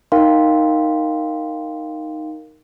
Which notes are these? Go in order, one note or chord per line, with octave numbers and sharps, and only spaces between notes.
D#4 A#4 F5 G5 C6